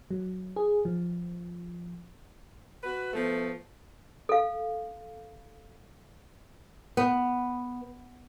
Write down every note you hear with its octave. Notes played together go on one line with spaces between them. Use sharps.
F#3
G#4
F3
F#4 B4
F3 A3 B3
A4 F5
B3